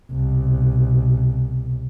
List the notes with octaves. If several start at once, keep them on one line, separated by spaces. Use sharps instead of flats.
C2 B2